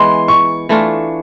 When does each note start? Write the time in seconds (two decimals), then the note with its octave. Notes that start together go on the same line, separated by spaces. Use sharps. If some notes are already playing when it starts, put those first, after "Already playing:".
Already playing: E3 G#3 B3 C6
0.28 C#6
0.69 E3 A3 D4 F4